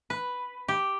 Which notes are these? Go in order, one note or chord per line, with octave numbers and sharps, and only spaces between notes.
B4
G4